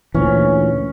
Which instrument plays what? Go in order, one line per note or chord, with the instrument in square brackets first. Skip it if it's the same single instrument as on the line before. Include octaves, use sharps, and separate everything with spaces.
[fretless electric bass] D2 A#2 E3 [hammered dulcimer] C#4